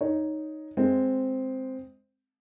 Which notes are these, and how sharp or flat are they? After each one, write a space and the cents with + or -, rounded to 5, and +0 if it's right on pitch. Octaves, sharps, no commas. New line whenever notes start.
D#4 +0 C#5 +0
G#3 +0 C4 -5